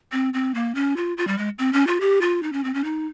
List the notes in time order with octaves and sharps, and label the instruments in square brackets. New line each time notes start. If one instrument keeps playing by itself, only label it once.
[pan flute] C4
C4
A#3
C#4
F4
F4
G3
G#3
C4
C#4
F4
G4
F4
D#4
C#4
C4
C#4
D#4